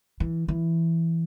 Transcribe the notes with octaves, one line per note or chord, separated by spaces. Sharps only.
E3
E3